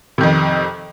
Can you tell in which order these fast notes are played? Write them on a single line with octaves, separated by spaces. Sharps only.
C3 D#3 F2